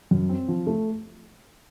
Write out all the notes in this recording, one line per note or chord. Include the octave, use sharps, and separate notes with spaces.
F#2
C4
F3
A3